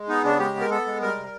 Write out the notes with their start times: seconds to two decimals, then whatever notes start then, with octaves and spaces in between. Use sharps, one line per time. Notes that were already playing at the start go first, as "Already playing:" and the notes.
Already playing: G#3
0.09 B3 D#4
0.24 C#3 D4
0.39 G#3 G4
0.55 B3
0.61 A#4
0.70 B3 A4
0.86 G#3
1.02 G3 A#4
1.17 C3